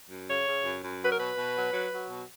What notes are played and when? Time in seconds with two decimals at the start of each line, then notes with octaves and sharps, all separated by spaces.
0.09 F#2
0.28 C#3 C#5
0.46 C#3
0.65 F#2
0.83 F#2
1.01 F#3 B4
1.09 A#4
1.17 B2 B4
1.36 B2
1.55 F#3
1.73 F#3
1.92 F#3
2.09 B2